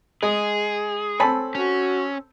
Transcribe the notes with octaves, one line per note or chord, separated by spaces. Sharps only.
G#3 G#4
C4 A4 C#5 G#5 A5 B5
C#4 F#4